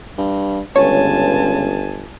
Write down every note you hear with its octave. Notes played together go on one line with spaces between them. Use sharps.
G2
G1 C#2 C#5 G#5 A5